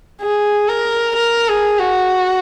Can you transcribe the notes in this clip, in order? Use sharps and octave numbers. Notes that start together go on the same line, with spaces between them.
G#4
A#4
A#4
G#4
F#4